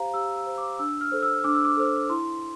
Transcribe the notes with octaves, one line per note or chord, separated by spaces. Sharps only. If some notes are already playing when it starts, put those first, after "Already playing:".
Already playing: G4 C5 F5 A#5
G4 E6
E6
C5
D6
D4 E6
F6
A4 C5
E6
D4 D6
E6
D6
A4 C5
E4 C6